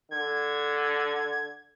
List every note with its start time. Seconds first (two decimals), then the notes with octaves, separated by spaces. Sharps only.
0.11 D3 G#6